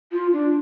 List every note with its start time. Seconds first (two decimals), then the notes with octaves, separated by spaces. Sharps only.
0.12 F4
0.33 D4